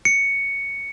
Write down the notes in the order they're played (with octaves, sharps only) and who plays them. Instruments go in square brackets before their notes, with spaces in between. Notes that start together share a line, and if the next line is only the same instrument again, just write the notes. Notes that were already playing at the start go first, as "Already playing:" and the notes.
[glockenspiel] C#7